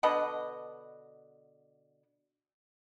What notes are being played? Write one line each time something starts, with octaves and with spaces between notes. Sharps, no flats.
B2 D3 B4 D#5